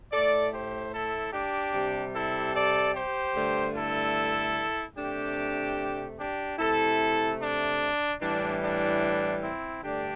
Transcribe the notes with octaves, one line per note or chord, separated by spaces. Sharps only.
A2 A3 A4 D5
G4 C5
E4 A4
D4 G4
C3 G3
E4 A4
A4 D5
G4 C5
G2 D3 A3
E4 A4
C3 A3 D4 G4
D4 G4
C3 A3 E4 A4
D4
A2 E3 G3 D4
D4
C4 E4
G2 D3 A3 D4 G4